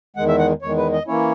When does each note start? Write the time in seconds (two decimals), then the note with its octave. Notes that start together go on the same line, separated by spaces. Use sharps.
0.16 E2 D#3 G#3 F#5
0.28 E5
0.39 F#5
0.62 E2 D#3 G#3 C#5
0.77 B4
0.92 D#5
1.07 E3 A#3 C#4 E4 C#5